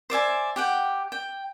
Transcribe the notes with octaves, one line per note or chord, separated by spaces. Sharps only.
C5 D5 E5 G#5
G4 F#5 G5
G5